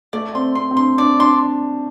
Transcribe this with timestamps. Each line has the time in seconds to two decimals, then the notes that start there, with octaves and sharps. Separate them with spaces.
0.13 A3 D5
0.35 C4 C6
0.55 C4 C6
0.71 C4
0.77 D4 C6
0.98 D4 D5
1.19 D4 C6